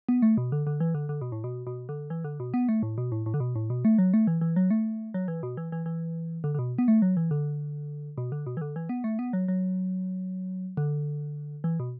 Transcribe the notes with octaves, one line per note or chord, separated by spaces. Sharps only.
B3
A3
B2
D3
D3
E3
D3
D3
B2
A2
B2
B2
D3
E3
D3
B2
B3
A3
A2
B2
A2
A2
D3
B2
A2
B2
A3
F#3
A3
E3
E3
F#3
A3
F#3
E3
B2
E3
E3
E3
D3
D3
B2
B3
A3
F#3
E3
D3
B2
D3
B2
E3
D3
E3
B3
A3
B3
F#3
F#3
D3
E3
B2